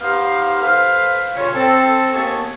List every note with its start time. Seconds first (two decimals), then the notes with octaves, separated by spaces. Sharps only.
0.01 B3 D#4 G4 C5 F5
0.61 A4 B4 C5 F5
1.34 D2 A#2 C#3 G3 C#4 C#5
1.53 C4 A4
2.13 D#2 A#3 B3 G#4 A5 C#6